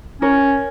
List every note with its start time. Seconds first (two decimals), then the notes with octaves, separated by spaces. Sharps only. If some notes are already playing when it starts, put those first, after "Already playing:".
0.21 C#4 A#4 C#5